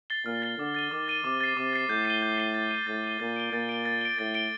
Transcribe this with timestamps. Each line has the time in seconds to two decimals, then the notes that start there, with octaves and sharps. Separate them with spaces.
0.10 A6 C7 G7
0.26 A#2 F6
0.42 A6 C7 G7
0.58 D3 D6
0.74 A6 D#7 G7
0.91 D#3 D6
1.08 A6 D#7 G7
1.24 C3 D6
1.41 A6 C7
1.56 C3 D6
1.73 A6 C7
1.89 A2 G6
2.05 C7 D#7 G7
2.22 G6
2.38 C7 D#7 G7
2.54 A6
2.71 D#7 G7
2.87 A2 A6
3.04 D#7 G7
3.20 A#2 A6
3.36 D7 G7
3.52 A#2 A6
3.69 D7 G7
3.85 A6
4.01 D7 G7
4.19 A2 A6
4.34 D7 G7